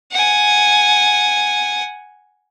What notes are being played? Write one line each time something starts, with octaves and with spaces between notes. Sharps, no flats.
F#5 G#5